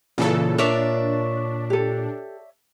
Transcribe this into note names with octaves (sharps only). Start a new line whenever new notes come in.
A#2 C#3 E3 A4 F#5
D4 A#4 C#5 D5 E5
G4 A4